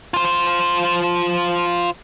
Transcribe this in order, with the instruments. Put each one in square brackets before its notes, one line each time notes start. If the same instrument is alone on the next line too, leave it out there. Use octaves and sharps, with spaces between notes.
[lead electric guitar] F4 C5